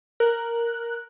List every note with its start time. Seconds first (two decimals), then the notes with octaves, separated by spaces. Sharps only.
0.20 A#4 F#6